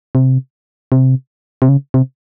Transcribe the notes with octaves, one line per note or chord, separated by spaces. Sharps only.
C3
C3
C3
C#3
C3